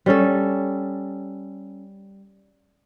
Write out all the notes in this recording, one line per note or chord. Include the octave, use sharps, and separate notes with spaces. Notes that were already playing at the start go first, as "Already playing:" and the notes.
G3 C#4 A4